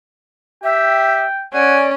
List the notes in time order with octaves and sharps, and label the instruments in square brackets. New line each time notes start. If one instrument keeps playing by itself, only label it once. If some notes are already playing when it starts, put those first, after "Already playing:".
[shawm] G4 [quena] E5 [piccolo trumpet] G5
[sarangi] C#4 [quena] D5 [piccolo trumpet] F#5 [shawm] G#5